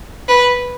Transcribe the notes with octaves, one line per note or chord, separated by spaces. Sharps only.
B4